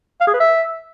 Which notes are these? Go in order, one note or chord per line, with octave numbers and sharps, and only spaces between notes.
F5
G#4
B4
E5